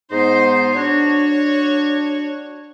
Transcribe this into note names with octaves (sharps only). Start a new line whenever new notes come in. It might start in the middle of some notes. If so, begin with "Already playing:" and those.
G#2 B3 D#4 C5
D4 F#4 C#5